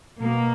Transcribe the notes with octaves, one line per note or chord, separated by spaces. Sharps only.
B2 A#3